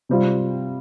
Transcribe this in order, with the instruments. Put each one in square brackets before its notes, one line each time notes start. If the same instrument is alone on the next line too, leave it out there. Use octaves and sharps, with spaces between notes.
[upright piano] C3 G3 C4 F4